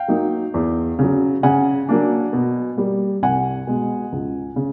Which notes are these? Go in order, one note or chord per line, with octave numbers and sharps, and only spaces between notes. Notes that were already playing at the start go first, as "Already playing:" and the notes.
Already playing: F5 G5
F#3 A#3 D#4
E2
C#3 F#3
C#3 F#5 G#5
F#3 A#3 D4
B2
G3 A#3
C2 F#5 G#5
B2 G#3
C#2
C#3